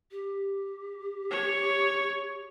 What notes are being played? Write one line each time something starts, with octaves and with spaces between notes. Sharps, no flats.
G4
C#5